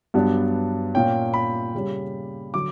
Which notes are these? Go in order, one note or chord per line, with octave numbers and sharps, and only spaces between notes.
G2 F#3 B3 D4
A#2 A#3 C#4 G5
B5
C#3 G3 C#4
D3 F#3 D6